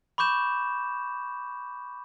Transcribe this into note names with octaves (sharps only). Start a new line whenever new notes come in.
B5 C#6 D6 G6 E7